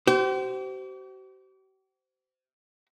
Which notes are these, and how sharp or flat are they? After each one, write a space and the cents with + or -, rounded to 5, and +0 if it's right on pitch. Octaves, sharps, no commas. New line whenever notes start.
G4 -45 C5 -15